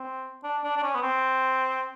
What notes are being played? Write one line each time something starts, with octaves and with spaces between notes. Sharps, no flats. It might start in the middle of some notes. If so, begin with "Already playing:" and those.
Already playing: C4
D4
D4
D4
C#4
B3
C4